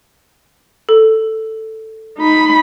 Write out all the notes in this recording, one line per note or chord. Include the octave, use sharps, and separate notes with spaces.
A4
D#4 B5